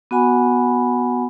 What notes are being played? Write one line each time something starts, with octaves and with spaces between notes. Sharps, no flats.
B3 F#4 F#5 G#5 B5